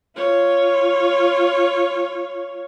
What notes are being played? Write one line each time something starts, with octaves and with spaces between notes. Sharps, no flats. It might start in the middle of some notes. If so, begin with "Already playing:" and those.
F4 C#5